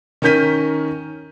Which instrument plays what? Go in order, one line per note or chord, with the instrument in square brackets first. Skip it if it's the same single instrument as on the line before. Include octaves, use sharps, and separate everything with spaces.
[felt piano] D#3 C#4 A#4 G6 B6 D#7